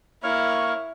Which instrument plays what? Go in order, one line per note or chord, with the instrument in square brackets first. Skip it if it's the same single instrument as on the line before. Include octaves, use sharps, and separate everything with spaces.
[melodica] A#3 C#5 C#6 [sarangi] E4 [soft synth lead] F6